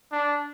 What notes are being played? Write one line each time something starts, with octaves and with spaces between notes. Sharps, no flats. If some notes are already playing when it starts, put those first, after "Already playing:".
D4